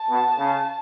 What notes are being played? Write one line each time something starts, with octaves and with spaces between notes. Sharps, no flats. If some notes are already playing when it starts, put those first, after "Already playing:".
Already playing: A5
B2
C#3